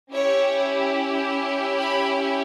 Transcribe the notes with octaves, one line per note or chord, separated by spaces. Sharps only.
C#4 E4 G4 C#5
B5